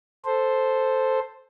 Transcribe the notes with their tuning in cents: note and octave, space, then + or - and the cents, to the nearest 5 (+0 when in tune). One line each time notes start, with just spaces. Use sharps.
A4 +0 C5 +0